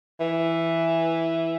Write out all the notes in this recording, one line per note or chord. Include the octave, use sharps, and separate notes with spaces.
E3